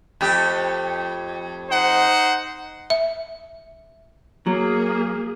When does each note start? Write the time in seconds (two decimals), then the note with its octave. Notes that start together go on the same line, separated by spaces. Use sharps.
0.21 F2 A3 G4
1.68 D#4 C5 F#5
2.90 E5
4.47 F#3 A#3 G#4